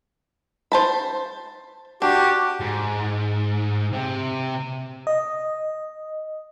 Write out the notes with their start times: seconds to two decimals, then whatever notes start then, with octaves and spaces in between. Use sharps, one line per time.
0.72 C5 A5 B5
2.02 D4 F#4 G4
2.60 G#2
3.93 C3
5.07 D#5